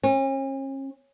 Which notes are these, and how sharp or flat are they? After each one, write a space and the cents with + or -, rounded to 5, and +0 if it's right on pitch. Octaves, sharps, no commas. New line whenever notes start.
C#4 -40